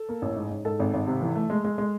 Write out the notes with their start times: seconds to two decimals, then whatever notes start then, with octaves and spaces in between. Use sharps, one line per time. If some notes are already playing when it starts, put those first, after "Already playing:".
Already playing: A4
0.09 A#3
0.22 A1
0.36 G#2
0.50 G#2
0.65 G#2 A4
0.80 G#1
0.94 G#1
1.07 C3
1.22 E3
1.35 A3
1.50 G#3
1.65 G#3
1.78 G#3